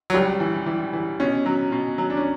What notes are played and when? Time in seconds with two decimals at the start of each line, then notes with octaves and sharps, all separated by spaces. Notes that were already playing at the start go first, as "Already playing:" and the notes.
0.10 F#3
0.14 C#2 G3
0.40 E3
0.66 E3
0.93 E3
1.20 B2 C#4
1.46 F#3
1.72 B2
1.98 F#3
2.10 D4
2.17 C#4